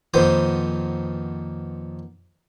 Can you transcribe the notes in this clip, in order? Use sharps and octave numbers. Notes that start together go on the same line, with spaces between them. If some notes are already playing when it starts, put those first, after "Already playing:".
F2 A#2 D#3 B3 C5 D#6